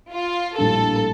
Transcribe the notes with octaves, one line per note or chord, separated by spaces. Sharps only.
F4
A#1 A2 G3 D4 A4